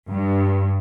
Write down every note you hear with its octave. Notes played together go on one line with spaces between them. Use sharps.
G2